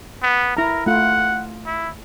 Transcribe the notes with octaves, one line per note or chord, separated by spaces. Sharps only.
B3
E4 A#4 A#5
A3 F4 F#5
E4